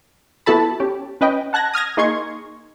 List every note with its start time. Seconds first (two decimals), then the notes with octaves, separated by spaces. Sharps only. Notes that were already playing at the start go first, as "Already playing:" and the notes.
0.46 B3 E4 F#4 A4 A5 B5
0.80 C#4 G4
1.21 C#4 B4 D#5 G5
1.53 F#5 A5 F#6 G#6 A#6
1.74 D#6 F6 G#6 A#6
1.97 A#3 D#4 G#4 C6 C#6 G#6